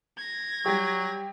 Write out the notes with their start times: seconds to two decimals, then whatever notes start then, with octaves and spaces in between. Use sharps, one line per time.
0.18 G#6 A#6
0.66 F#3 G3 G4